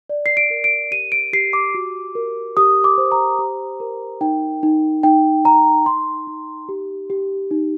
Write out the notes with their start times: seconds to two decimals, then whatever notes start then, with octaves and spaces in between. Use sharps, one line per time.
0.09 D5
0.26 C7
0.37 D7
0.50 A#4
0.64 D7
0.91 G4 D#7
1.12 D7
1.33 G4 C7
1.53 D6
1.74 F#4
2.15 A#4
2.57 G4 D#6
2.84 D6
2.98 C5
3.12 A#5
3.39 G4
3.80 A#4
4.21 D#4 G5
4.63 D#4
5.03 D#4 G5
5.45 D#4 A#5
5.86 D#4 C6
6.27 D#4
6.69 G4
7.10 G4
7.51 D#4